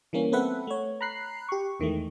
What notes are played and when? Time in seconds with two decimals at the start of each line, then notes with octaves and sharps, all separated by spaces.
0.13 E3 G3 A#3 C#4
0.32 B3 C4 A4 B4 E5 F#5
0.67 A3 C#5
1.01 A#5 B5 F#6 C7
1.49 G4 C#6
1.80 E2 D#3 E3 G#3 A3